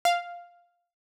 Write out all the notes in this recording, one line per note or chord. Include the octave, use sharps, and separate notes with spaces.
F5